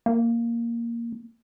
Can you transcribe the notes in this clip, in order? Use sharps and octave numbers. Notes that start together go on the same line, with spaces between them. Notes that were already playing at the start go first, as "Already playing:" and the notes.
A#3